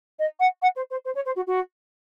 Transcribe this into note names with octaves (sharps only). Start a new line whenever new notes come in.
D#5
F#5
F#5
C5
C5
C5
C#5
C5
F#4
F#4